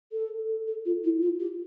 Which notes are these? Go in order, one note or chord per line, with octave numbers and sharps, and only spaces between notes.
A4
A4
F4
E4
F4
G4